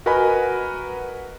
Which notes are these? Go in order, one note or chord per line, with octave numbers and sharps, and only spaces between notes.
F#4 A#4 B4 D#5 G#5 B5